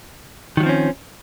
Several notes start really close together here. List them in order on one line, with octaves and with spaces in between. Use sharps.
D#3 F#3 F3 C4 C#4